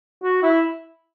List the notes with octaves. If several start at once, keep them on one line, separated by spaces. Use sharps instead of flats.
F#4
E4